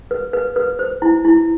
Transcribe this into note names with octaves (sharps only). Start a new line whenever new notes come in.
B4
B4
B4
C5
E4
E4